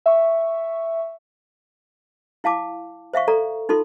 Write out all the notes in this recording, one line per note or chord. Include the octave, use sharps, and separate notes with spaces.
E5 C#6
E4 F5 A5 D6
C5 E5 F5 C#6
A4 D5 A#5
D#4 F4 A4 C6